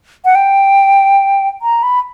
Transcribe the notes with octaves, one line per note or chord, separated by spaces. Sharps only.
F#5
G5
A#5
B5